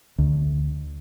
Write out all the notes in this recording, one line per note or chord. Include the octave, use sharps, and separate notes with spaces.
D2